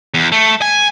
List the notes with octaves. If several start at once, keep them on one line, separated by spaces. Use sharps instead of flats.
E2
A3
G#5